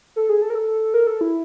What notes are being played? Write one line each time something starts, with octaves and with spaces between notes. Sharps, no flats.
A4
G#4
A4
A#4
A4
A#4
A4
E4